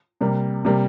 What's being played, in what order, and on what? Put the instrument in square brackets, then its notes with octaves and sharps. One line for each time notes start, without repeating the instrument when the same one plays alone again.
[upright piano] C3 G3 A#3
C3 G3 A#3